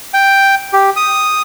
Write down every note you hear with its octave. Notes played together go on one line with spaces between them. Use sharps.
G5
G4
D#6